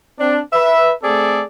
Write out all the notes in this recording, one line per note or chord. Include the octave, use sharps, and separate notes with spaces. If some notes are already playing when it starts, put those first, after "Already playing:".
C4 D4
B4 E5
A3 C4 G#4 A4 D5